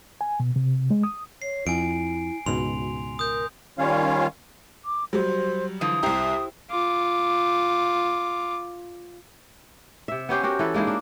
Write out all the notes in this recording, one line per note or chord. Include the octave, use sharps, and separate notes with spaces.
G#5
B2
C3
G#3
D#6
C#5 C7
F2 E4 G#5 D7
C#2 G#2 B2 F#4 C6 F7
A#4 D#6 G6
D#3 G3 C#4 F4 C#5 F5
D6
F#3 G3 C5
D3 E3 F3 D#6
C2 E4 G4 C5 A#5
F4 D6
C3 E5
B3 C#4 G4 C5
F#4 G4 A#4
E3 A4 B4
G#3 A#3 D#4 E4
D4